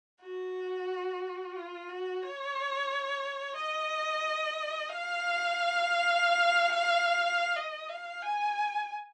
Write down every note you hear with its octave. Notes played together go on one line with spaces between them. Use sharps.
F#4
F4
F#4
C#5
D#5
F5
D#5
F5
G#5